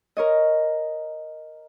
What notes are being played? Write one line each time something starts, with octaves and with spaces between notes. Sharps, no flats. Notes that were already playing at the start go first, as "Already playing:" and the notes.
A#4 C#5 D#5